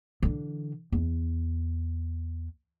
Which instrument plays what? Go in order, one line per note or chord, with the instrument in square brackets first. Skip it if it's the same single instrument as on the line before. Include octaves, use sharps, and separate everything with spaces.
[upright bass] D3 E3
E2